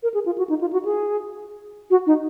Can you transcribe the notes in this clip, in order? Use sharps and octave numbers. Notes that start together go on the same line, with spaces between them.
A#4
G#4
F4
F#4
D#4
F4
F#4
G#4
F#4
D#4